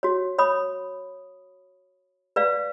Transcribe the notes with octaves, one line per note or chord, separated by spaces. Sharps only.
F#4 C#5
C#5 B5 D#6
B4 D5 F5